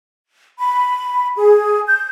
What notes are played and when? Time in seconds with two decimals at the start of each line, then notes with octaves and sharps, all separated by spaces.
0.58 B5
1.36 G#4
1.87 G6